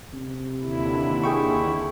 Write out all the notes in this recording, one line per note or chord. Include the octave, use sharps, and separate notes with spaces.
C3
D#2 D3 E4
G#4 G5 C#6